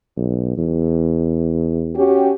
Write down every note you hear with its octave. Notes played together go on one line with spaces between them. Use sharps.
B1
E2
C#4 F#4 G4